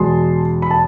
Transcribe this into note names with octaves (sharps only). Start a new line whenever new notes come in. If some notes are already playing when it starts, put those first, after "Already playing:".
Already playing: E2 B2 G#3 A5 C6
B5
A5